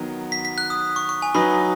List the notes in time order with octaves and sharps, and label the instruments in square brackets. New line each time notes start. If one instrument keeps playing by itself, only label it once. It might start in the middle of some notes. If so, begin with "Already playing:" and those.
Already playing: [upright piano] D#3 F#3 B3
[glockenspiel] B6
B6
F#6
D#6
C#6
C#6
G#5
[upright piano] F#3 D#4 B4 [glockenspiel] B5